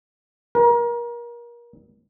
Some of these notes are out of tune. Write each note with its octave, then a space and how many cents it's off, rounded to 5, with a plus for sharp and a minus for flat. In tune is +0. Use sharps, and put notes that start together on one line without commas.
A#4 +30